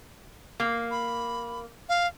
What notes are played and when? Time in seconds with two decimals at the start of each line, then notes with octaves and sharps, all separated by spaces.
0.60 A#3
0.91 B5
1.89 F5